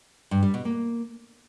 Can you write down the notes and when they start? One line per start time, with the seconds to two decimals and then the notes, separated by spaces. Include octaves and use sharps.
0.31 G2
0.43 G3
0.54 B2
0.65 A#3